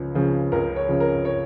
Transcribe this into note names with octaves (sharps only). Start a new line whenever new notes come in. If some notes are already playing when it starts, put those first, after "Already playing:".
Already playing: C#2 C#3 F3
C#3 F3
C#2 A#4
C#5
C#3 F3
A#4
C#5